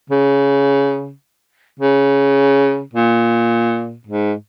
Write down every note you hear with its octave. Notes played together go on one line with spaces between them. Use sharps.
C#3
C#3
A#2
G#2